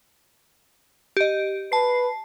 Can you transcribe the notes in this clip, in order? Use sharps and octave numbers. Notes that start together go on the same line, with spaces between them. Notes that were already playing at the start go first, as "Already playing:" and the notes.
G4 D#5
B4 A5 C7